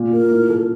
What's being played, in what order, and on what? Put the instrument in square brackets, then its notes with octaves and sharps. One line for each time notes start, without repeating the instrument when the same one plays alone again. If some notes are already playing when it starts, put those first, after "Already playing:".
Already playing: [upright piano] A#2
[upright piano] A#2 [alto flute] A#4
[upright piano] A2
A4